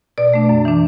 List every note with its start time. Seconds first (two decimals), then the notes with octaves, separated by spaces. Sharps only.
0.18 B2 D5
0.34 A3 D4
0.49 F#2
0.65 E3 D4